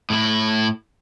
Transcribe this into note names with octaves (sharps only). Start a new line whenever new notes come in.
A2 E4